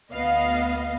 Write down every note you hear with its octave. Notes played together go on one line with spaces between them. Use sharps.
D2 B3 D#5 F5